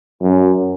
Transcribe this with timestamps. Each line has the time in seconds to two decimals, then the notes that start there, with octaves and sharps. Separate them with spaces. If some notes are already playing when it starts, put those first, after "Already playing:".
0.22 F#2